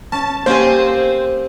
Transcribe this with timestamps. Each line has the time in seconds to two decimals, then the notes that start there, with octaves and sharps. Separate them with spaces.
0.12 C#4 A5
0.46 A#3 C4 C#4 G4 C5 G#5